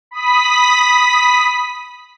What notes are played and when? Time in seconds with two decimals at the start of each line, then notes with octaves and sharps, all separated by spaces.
0.11 B5 D#6 B6